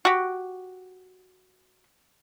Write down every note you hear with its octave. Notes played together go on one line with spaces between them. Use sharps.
F#4 G4